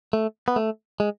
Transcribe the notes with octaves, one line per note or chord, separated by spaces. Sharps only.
A3
B3
A3
G#3